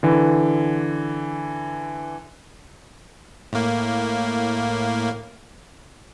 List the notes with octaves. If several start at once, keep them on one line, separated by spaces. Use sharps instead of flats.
D3 E3
A2 A#3